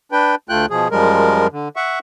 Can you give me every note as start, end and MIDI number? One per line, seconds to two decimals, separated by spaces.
0.12 0.35 62
0.12 0.35 71
0.12 0.35 79
0.49 0.66 38
0.49 0.66 57
0.49 0.66 65
0.49 0.66 79
0.49 0.66 90
0.70 0.88 47
0.70 0.88 53
0.70 0.88 68
0.91 1.47 42
0.91 1.47 53
0.91 1.47 55
0.91 1.47 56
0.91 1.47 70
1.52 1.69 50
1.76 1.99 76
1.76 1.99 78
1.76 1.99 85